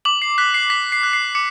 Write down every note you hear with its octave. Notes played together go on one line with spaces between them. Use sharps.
D6 F#7
C7
F#6 B6
C7
D6 B6
C7
F#6
C7
D6 C#7